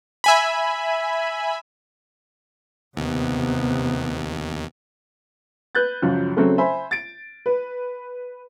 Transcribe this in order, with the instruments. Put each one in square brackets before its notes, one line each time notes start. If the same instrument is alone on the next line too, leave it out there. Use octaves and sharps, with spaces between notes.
[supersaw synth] E5 G#5 B5
[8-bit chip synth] D#2 [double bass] C3 B3
[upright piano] B4 F#6 G6 A6
C#2 F#2 F3 F#3
C#3 F#3 A3 C4 C#4 A4
C5 E5 G#5 B5
A6 D7
B4